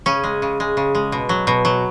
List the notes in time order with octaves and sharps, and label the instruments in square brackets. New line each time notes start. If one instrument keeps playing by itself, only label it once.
[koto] C#3 C#4
G#3
C#3
G#3
C#3
G#3
B2
F#3
B2
F#3